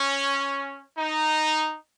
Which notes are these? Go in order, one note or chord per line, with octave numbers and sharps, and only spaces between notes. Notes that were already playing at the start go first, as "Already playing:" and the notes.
Already playing: C#4
D#4